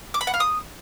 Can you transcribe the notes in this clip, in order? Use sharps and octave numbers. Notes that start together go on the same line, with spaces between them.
D6
B5
F#5
F5
D#6